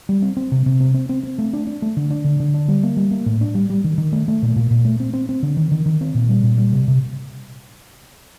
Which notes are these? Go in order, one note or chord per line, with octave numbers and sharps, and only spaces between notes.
G3
C4
C4
C3
C3
C4
C4
C4
C4
A3
D4
D4
A3
D3
D4
D3
D3
D4
G3
A#3
G3
A#3
A2
D4
G3
G3
D#3
D#3
A3
A3
A#2
A#2
A#2
A3
C4
C4
C4
D3
D#3
D#3
D#3
C4
A#2
G3
A#2
G3
C3
C3